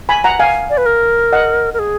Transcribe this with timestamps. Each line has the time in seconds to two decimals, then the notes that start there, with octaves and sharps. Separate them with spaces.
0.09 G#5 B5
0.24 F#5 A#5
0.40 F5 G#5
0.70 D5
0.77 B4
0.86 A#4
1.32 D#5 F#5
1.74 A#4
1.79 G#4